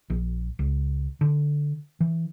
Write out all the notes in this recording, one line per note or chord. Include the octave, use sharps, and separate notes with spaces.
A#1
C#2
D3
E3